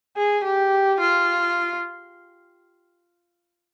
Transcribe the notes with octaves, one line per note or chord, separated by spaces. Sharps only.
G#4
G4
F4